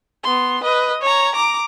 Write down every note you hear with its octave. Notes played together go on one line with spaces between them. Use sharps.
B3 C6
B4 D#5
C#5 A#5
A#5 D6